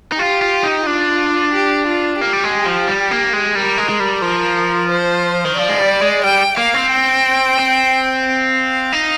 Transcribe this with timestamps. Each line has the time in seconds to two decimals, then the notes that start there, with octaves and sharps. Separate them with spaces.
0.12 D#4
0.19 F4 G4
0.42 F4
0.64 D#4
0.86 D4 F4
1.54 G4
1.87 F4
2.21 A#3 G4
2.33 G3
2.44 G#3
2.65 F3
2.88 G3
3.11 A#3
3.33 G#3
3.55 G3 A#4
3.78 G#3
3.89 G#3
4.00 G3
4.22 F3 A#4
4.90 C5
5.45 D#3
5.57 F3 D5
5.69 G#3
5.79 G3
6.02 G#3
6.24 G3 G5
6.57 A#3 F5
6.74 C4
6.92 G5
7.59 C4
8.26 F5
8.92 D#4